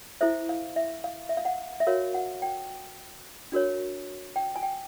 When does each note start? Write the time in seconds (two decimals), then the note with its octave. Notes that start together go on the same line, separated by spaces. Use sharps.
0.21 E4 A4 C5 E5
0.49 F5
0.76 E5
1.04 F5
1.29 E5
1.37 F5
1.45 F#5
1.80 E5
1.87 F#4 A#4 C#5 F5
2.14 F#5
2.42 G5
3.52 D4 F#4 A#4 C#5
4.36 G5
4.56 G#5
4.63 G5